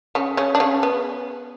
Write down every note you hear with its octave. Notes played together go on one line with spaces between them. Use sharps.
C#3 C#4
C#3 C#4
D4
C#3 C#4
B3